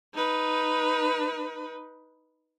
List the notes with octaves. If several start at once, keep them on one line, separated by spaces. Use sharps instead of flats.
D#4 B4